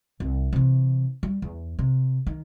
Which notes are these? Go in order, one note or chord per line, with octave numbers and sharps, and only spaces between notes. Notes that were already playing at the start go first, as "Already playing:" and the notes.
C2
C3 E3
G3
E2
C3
D#3